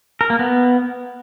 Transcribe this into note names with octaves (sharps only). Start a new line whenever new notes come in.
A#4
A#3
B3